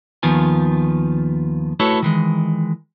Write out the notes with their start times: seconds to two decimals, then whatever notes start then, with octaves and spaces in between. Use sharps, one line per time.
0.23 D#2 D#3 F3 B3 F4 G#5
1.80 A3 E4 F#4 A4 B4 C#5
2.02 D#3 E3 G#3